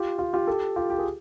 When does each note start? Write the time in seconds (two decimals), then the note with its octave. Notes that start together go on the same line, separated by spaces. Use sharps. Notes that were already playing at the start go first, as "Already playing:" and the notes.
Already playing: F4 G4
0.19 F4
0.33 F4 G4
0.47 G4 A4
0.76 F4 G4
0.90 G4
0.99 G#4